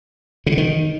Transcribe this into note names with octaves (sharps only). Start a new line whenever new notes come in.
C#3
D3
D#3